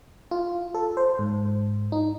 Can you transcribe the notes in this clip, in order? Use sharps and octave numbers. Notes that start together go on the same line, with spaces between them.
F4
A4
C5
G#2
D#4